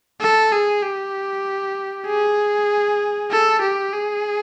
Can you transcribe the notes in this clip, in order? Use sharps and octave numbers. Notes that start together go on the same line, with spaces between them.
A4
G#4
G4
G#4
A4
G4
G#4